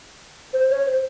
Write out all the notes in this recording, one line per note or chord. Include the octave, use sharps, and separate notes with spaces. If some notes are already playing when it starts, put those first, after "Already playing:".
C5
C#5
C5